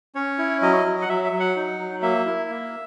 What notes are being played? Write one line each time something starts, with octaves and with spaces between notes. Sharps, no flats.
C#4 C#5
E4
F#3 D#5
F#3
F#5
F#3 E5
E5
F#3
F#5
D#4
F#3
A#3 E5
E4
A#3